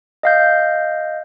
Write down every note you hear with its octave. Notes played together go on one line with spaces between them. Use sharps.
D#5 F5 G6